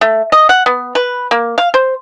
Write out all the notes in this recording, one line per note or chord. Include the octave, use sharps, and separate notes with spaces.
A3
D#5
F#5
B3
B4
A#3
F5
C5